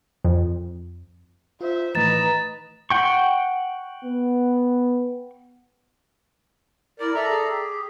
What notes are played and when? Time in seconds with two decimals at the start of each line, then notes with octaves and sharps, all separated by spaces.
0.25 F2
1.61 F4 C5 E5
1.95 A2 D#3 E3 B4 D#5 A#5 A6 E7
2.90 F#5 G5 C#6
4.05 B3
7.00 E4 A#4 D5
7.15 A4 D5 E5 A#5
7.29 G#4
7.48 G4